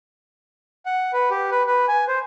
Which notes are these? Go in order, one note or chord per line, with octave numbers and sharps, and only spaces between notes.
F#5
B4
G4
B4
B4
G#5
C5